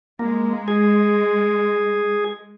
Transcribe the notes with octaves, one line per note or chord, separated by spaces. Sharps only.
G#3 A#3
G#4